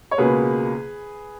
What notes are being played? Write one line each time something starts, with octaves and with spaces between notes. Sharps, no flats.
C#5
C#2 B2 A#3 G#4 B4